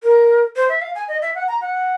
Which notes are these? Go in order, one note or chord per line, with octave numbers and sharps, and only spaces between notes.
A#4
C5
E5
F5
G#5
D#5
E5
F#5
A#5
F#5